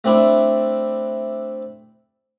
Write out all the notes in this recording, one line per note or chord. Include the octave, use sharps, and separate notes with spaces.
A3 C4 D4 E4